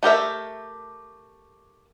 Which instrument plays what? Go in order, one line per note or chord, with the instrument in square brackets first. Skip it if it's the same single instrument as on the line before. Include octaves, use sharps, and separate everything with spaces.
[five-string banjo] A3 G4 A#4 E5